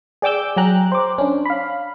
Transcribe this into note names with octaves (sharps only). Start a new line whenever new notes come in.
G#4 D5 G5 D6 E6 G6
F#3 G#4 G5 A#5 F#6
C5 D6
C#4 D4
F5 B5